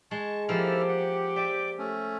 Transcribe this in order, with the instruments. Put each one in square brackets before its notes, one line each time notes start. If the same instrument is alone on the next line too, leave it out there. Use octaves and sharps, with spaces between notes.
[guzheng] G#3 [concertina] A5 C#6
[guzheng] F3 A#3 [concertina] E4 A4 F6 [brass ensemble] G4
[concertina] F#5
[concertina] D5 G5 [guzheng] E5
[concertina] A3 C#4